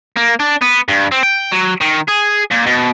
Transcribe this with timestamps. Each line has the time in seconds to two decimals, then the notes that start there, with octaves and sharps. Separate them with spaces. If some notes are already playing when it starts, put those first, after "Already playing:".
0.16 A#3
0.40 D4
0.61 B3
0.88 G2
1.12 C4
1.23 G5
1.52 F#3
1.81 D#3
2.08 G#4
2.51 A#2
2.66 B2